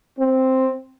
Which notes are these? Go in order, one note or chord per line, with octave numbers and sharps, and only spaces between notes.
C4